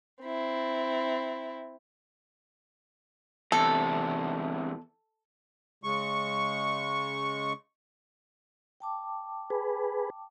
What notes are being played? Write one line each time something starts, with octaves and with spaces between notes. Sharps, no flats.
C4 E4
E2 C3 A4
C#3 G#3 C#6
G5 A5 D6
G#4 B4